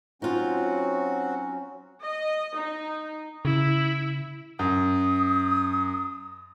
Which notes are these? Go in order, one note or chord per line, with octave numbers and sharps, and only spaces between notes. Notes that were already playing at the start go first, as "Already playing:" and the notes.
F#3 C4 C#4 D#4 F4 F#4
D#5
D#4
C#3 E4
F#2 D#6